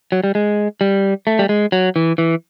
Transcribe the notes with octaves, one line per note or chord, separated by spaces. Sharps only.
F#3
G3
G#3
G3
A3
G3
G#3
F#3
E3
E3